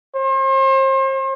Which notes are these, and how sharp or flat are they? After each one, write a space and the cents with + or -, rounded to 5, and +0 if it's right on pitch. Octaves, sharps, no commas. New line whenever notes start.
C5 +40